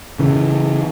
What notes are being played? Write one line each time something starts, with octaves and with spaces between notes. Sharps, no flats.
C#3 E3